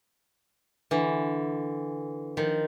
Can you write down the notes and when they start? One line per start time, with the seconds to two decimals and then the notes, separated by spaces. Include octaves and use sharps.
0.91 D3 E3
2.37 D#3 F3